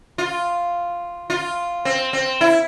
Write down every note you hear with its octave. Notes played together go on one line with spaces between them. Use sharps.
F4
F4
C4
C4
E4